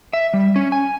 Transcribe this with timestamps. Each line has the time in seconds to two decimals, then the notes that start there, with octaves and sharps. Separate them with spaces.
0.13 E5
0.34 G3
0.56 C#4
0.72 G#5